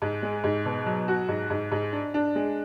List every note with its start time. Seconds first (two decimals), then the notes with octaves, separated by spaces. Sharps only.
0.02 G#2
0.22 G#3
0.44 G#2
0.65 B2
0.86 F#3
1.08 F#4
1.29 G#2
1.50 G#2
1.72 G#2
1.93 D4
2.14 D4
2.35 G#3